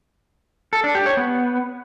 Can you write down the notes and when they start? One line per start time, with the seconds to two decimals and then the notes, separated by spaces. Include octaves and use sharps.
0.73 A4
0.84 D4
0.95 G4
1.06 C#5
1.17 B3